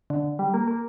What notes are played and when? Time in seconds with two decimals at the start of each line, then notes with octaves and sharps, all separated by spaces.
0.10 D3
0.39 G3
0.54 A#3
0.68 A#3